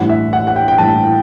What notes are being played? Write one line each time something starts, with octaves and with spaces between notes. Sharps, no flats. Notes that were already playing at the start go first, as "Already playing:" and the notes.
Already playing: A1 G2 E3 F#5
E5
F#5
F#5
G5
G5
A1 G2 E3 A5